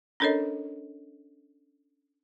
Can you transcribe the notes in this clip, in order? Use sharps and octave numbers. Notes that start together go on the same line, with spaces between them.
C#4 D4 A4 A#4 C#5 D#5